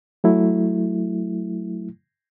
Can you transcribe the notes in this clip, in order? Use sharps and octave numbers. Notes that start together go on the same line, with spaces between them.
F#3 A3 E4